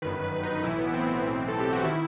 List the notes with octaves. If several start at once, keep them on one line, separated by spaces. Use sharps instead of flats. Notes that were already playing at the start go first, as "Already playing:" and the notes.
G1 F#2 D#3 B4
B4
D#4
B1 A2 E3 E4
B3
C4
C4
B1 A2 E3
A4
G4
F#4
D#3 E4